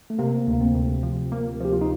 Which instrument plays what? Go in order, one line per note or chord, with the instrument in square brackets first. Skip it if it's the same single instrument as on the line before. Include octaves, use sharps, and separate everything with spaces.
[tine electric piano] A3
[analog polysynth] C3 [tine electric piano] A#3
[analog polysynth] D2
[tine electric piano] A#3
C4
[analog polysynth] D2
F3
A#3
[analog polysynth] F3 [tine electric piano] G4
[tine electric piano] F4
D#4